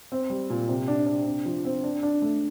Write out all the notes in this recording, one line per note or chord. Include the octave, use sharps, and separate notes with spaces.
C4
G3
A#2
C3
D4
D4
C3
F3
C4
D4
D4
A3